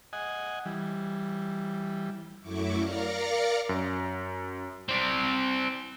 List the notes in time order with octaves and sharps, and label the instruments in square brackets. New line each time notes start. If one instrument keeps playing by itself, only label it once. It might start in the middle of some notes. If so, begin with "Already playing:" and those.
[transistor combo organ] D#5 F#5 G#5
E3 G3
[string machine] F#2 F#3 A3 E4 C#6 D6
A#4 D5 F5 A#6 C#7
[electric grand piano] F#2
[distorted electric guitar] C4 D5